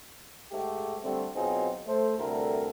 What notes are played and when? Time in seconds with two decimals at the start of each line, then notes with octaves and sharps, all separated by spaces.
0.52 G#2 G#3 A3 G4
1.03 D3 G3 A3 C4
1.35 B2 F#3 C4 D#4 F4 G#4
1.87 A3 A4 C5
2.18 D2 C3 G3 E4 A4 A#4